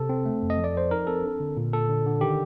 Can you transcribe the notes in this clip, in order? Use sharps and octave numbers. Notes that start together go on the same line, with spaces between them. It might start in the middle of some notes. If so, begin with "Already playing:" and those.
Already playing: C3 A4
C4
A3
F2
D#5
F3
D5
F3 C5
D#4 A#4
C4 A4
D4
D3
A#2
A#2 A4
D3
D3
D#3 G4